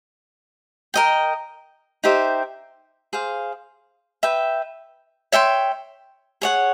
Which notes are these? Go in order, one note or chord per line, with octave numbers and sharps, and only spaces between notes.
A#4 D#5 G5
D#4 G4 C5 E5
G#4 C5 F5
B4 E5 G5
C#5 E5 G5 C6
G#4 C#5 F#5